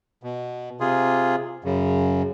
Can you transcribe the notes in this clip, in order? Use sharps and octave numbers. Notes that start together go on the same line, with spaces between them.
B2
C3 F4 G#4
F#2 C#3